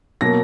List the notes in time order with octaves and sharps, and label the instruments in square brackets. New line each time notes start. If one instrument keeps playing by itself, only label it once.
[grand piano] B2 F#3 A#3 A#6